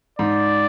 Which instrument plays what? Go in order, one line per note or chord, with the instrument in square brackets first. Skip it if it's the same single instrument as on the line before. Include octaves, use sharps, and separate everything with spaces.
[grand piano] G#2 [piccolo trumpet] D5